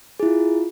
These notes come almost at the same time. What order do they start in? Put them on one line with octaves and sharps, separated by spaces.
G#4 E4 F4